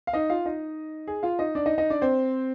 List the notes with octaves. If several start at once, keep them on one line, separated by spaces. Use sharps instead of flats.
F5
D#4 D#5
F4 F5
D#4 D#5
G#4
F4 F5
D#4 D#5
D4 D5
D#4 D#5
D#4 D#5
D4 D5
C4 C5